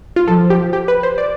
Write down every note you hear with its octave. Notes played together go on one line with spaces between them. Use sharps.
F4
F3 A4
G4
G4
B4
C5
D5